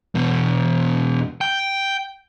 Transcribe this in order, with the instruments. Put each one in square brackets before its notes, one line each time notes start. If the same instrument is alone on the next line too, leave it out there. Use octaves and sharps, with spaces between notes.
[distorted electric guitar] E2 B2
G5